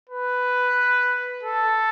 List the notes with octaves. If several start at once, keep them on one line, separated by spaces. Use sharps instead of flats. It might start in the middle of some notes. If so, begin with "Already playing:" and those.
B4
A4